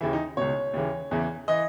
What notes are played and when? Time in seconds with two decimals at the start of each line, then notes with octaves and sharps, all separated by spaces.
0.01 D#2 C#3 E3 E4
0.13 D#4
0.37 C#2 B2 C#5
0.74 D#2 C#3 E3
1.11 E2 C#3 E3
1.48 E3 D#5